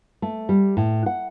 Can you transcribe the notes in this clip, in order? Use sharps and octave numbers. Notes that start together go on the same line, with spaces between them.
A3
G3
A2
F#5